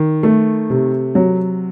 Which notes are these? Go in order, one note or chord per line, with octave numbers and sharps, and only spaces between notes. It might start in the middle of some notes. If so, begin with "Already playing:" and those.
Already playing: D#3
A3
C3
F#3